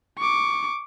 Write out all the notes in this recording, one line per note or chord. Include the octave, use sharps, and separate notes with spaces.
C#6 D6